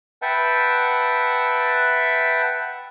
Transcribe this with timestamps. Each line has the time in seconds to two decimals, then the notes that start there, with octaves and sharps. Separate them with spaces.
0.22 B4 E5 F#5 G5 A5